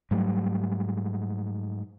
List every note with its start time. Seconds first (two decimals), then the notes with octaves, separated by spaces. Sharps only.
0.11 G#2 F#3 G3 A3